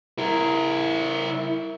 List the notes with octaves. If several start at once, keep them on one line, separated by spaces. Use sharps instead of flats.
E4 A#4